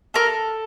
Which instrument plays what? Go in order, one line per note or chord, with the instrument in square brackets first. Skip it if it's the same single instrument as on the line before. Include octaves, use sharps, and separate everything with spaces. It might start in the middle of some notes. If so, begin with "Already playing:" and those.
[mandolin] A4 A#4